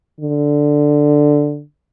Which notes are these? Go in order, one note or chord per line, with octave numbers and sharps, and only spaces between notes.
D3